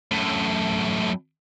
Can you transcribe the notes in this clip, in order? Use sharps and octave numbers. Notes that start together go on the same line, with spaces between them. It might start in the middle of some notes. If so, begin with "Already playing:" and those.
F#2 A2